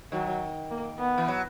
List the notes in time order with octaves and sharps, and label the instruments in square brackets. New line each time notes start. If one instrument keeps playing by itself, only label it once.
[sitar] D#3 [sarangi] F#3
[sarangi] A#3
B3
[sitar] E3
F#3